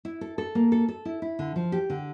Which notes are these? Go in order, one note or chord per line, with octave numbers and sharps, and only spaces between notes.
E4
A4
A4
A#3
A4
A4
E4
E4
D3
F3
G4
D3